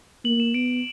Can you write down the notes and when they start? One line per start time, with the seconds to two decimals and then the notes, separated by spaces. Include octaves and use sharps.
0.24 A#3 F#7
0.40 E7
0.54 B3 D7